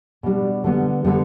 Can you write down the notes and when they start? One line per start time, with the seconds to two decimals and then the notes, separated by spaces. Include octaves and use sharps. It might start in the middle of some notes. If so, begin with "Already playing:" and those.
0.23 B2 G3 D4
0.64 D3 G3 B3
1.04 D3 G3 B3